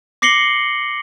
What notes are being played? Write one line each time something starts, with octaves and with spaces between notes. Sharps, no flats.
D6 A#6 C7 C#7 F#7 G7